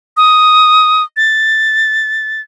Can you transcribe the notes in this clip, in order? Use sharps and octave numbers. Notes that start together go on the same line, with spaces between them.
D#6
A6